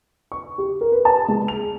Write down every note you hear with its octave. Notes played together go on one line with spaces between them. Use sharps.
C#6
G4
A#4
B4
A5
G#3
F7